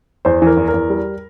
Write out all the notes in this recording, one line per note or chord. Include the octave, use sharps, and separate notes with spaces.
E2 C5
E3 A#4
E2
A#4
E2
G3